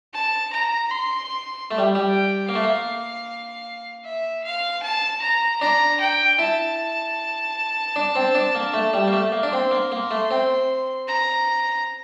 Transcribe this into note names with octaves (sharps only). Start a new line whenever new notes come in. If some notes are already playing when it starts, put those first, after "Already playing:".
A5
A#5
C6
A3
G3
G3
G5
A#3 F5
A3
A#3
E5
F5
A5
A#5
D4 A#5
G5
E4 A5
D4
C4
D4
A#3
A3
G3
A#3
A3
A#3
D4
C4 C6
A#3
A#3
A3
C4
A#5